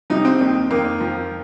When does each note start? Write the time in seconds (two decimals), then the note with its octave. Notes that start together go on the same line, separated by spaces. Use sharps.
0.10 C2 C3 F3 D#4
0.25 C4
0.40 D#2 D#3
0.70 F2 D#3 A#3
1.00 F2 F3